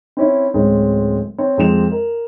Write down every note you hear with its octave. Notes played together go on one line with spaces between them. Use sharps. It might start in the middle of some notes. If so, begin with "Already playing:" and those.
C4 C#4 E4
D1 G#3 C4 C#4
C4 C#5
F2 G#3 C4 E7 F7
A#4